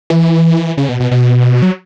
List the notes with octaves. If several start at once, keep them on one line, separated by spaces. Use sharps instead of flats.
E3
C#3
B2
B2
B2
F#3